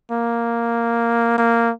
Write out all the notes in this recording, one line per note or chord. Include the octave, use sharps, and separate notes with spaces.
A#3
A#3